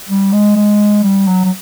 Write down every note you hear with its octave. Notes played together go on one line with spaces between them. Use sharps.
G3
G#3
G#3
G3
F#3
F#3